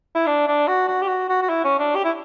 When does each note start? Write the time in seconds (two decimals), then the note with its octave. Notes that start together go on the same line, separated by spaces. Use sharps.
0.15 E4
0.26 D4
0.47 D4
0.67 F#4
0.88 F#4
1.02 G4
1.08 F#4
1.29 F#4
1.42 F#4
1.49 E4
1.64 C#4
1.79 D4
1.95 G4
2.05 E4